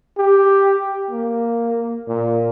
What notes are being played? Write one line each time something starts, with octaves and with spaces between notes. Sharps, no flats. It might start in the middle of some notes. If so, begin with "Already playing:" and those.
G4
A#3
A#2